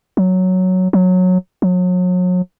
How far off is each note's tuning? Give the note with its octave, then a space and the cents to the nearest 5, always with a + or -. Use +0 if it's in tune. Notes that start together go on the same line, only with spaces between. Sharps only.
F#3 +0
F#3 -15
F#3 -35